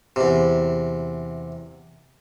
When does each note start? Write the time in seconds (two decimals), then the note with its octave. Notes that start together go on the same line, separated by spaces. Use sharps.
0.16 E2 C3